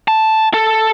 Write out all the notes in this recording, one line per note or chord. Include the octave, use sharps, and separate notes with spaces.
A5
A4